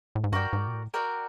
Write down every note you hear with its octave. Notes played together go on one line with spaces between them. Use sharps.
A2
G#2
G2 F#4 A#4 D5 G5
G#2
A#2
A2
F#4 A#4 D5 G5